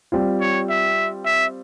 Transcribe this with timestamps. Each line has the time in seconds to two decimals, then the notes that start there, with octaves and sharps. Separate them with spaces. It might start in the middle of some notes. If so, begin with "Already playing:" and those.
0.12 G3 C4 F4
0.41 C#5
0.70 E5
1.26 E5